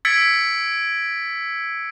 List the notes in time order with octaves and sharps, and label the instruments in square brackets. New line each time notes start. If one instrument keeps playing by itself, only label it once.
[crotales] E6 G#6 A6 B6 C#7 D7